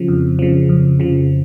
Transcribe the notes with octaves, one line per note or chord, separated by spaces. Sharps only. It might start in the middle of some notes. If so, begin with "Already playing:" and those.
Already playing: C#3 F3
F2
C#3 F3
F2
C#3 F3